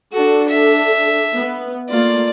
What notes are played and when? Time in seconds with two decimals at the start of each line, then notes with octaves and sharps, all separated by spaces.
0.13 D4 F#4 A4
0.49 E5
1.37 B3
1.89 A3 A#3 F4 D5